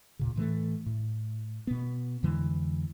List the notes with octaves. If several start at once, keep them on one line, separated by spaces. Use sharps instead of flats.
D#2 A#2 C#3
A2 E3 F#3 A3
A2
B2 B3
F2 D3 E3 G#3